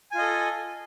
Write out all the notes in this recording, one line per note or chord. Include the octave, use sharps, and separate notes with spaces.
F4 A4 D#5 G#5